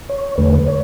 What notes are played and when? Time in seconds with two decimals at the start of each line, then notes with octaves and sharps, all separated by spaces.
0.09 C#5
0.38 E2 D3 A3 B4
0.53 B4
0.68 C#5